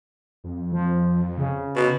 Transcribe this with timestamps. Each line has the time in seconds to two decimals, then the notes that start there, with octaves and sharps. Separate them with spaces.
0.44 F2
0.72 F3
1.38 C#3
1.76 B2